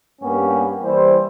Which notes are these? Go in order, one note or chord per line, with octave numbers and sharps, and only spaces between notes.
G2 A#3 B3 C#4 G4
E3 G3 E4 C5